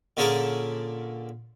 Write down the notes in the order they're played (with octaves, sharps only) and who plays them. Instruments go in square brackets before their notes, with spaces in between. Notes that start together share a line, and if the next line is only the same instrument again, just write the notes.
[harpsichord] A#2 D3 C#4 G#4 A#4 A5